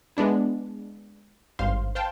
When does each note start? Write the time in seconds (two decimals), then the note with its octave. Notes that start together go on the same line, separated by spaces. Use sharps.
0.17 G#3 B3 D4 E4
1.59 G#1 G2 C5 F5 C6
1.95 C5 F5 G5 A5 C6